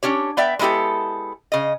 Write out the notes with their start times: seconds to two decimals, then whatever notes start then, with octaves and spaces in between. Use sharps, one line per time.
0.03 C#4 D4 G4 C#5
0.37 B3 D5 E5 G5
0.59 G#3 B3 E4 G4 A4
1.52 C#3 D#5